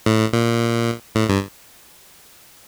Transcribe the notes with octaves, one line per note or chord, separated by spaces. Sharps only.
A2
A#2
A2
G2